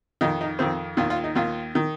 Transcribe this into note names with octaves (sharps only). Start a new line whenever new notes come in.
F2 D#3 D#4
D#4
F2 D#3 C4
D#2 D#3 F4
F4
D#4
D#2 D#3 F4
D#3